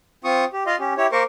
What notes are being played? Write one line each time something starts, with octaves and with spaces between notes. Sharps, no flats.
C4 F4 C#6 D#6
G4
F4 D#5 F5 C6
C#4 G4
E4 G4 C#5
A#3 A#4 C5 C#6 D6